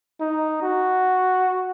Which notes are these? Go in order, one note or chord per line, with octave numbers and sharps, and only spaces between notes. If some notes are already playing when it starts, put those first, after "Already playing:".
D#4
F#4